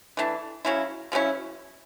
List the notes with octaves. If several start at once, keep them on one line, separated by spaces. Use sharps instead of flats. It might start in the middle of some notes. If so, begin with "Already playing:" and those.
E3 A3 D4
C#3 F#3 C#4 E4
C#3 F#3 C#4 E4